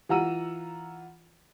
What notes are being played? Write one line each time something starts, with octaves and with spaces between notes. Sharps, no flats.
E3 F4 F#5 A#5 E6 D#7